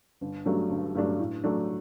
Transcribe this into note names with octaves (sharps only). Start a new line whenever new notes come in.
G1
G2 F#3 A3 D4
G1
G2 F#3 A3 D4
A2
F#3 A3 D4